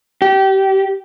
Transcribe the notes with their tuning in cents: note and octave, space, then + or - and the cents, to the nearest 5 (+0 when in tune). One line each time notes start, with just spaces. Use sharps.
G4 -25